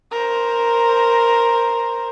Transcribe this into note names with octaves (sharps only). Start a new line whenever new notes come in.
A#4 C5